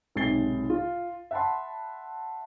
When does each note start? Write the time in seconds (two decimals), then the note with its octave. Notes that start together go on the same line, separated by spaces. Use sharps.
0.16 B1 G#2 C3 A6 C7 G7
0.70 F4
1.31 E5 F#5 A5 B5 C6